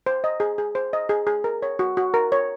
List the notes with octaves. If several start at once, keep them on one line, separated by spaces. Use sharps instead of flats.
C5
D#5
G#4
G#4
C5
D#5
G#4
G#4
A#4
C#5
F#4
F#4
A#4
C#5